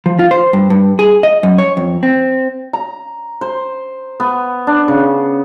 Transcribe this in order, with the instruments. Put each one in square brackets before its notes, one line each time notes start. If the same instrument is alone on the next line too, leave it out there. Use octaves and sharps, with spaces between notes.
[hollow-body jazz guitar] F3
F4
C5
G2
G2
G#4
D#5
F#2
C#5
F2
C4
[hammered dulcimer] A#5
C5
B3
D4
C#3